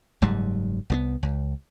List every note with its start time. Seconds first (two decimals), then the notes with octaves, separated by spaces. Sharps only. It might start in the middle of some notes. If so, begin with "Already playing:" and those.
0.22 F#1 G#2 F#3 G3
0.90 C2 G#3 B3
1.23 C#2